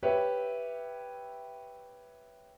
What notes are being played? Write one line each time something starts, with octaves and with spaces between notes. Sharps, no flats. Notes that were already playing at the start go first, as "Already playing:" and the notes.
G4 B4 C#5 E5